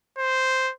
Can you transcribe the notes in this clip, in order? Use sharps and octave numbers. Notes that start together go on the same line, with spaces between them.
C5